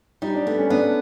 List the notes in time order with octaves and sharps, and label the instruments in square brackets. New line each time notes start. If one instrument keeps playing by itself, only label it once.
[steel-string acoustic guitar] G3 [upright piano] D#4
[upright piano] D4
[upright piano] A3 [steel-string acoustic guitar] B3
[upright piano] C#4
[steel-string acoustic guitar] B3 [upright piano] D4